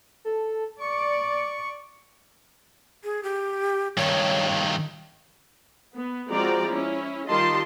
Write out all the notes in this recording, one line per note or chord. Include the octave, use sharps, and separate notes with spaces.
A4
D5 C#6
G#4
G4
G2 D#3 C#5
B3
F3 G#3 C4 F#4 D5 A#5
C#4 E4
D#3 G3 F4 D#5 A5 C6